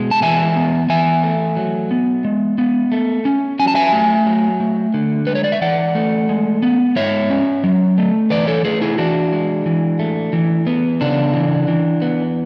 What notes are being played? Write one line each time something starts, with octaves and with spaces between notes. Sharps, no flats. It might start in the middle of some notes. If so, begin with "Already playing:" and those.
Already playing: B2 G#3
A5
E3 E5 G#5
B3
E3 E5 G#5
A3
F#3
B3
G#3
B3
A3
C#4
F#3 G#5
A5
E5 G#5
A3
F#3
A3
D3
G#3 B4
C#5
D5
E5
E3 D5 F#5
A3
G#3
B3
G#3 C#5 E5
C#4
F#3
A3
E3 B4 D5
A4 C#5
A3 G#4 B4
E4 G#4
E3 D4 F#4
G#3
E3
A3
E3
B3
C#3 D4
E3
E3
B3